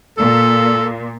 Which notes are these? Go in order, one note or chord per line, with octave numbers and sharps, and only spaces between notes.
A#2 A4